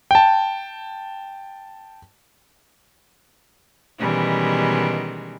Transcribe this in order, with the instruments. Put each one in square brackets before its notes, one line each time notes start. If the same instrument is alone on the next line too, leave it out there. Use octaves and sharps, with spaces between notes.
[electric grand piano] G5 A5
[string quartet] B2 D#3 E3 G3 G#3 C#4